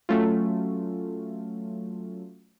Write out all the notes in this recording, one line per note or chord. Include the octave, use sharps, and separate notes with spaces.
F#3 A3 C#4 F4